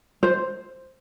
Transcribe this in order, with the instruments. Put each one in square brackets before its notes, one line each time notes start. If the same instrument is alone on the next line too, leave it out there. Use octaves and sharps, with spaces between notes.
[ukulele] C5